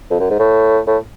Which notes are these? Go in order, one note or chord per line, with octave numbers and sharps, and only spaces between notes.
F2
F#2
G#2
A2
A2